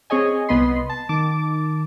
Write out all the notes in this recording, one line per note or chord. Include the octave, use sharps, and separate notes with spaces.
C4 G#4 C#5 D#5 G#5
C2 B3 D#5 B5 C6
A5
D#3 A5 D6